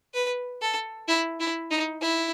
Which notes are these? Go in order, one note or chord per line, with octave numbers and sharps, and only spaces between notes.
B4
A4
E4
E4
D#4
E4